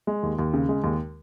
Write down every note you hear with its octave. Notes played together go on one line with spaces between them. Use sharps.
G#3
D#2
D#2
C#3
G#3
D#2